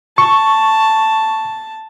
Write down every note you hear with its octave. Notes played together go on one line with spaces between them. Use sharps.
A5 C#6